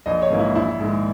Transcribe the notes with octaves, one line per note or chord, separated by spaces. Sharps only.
A#1 D#5
C#5
G#2 E3 A#3
E4
A#1 E4
G#2 D#3 G#3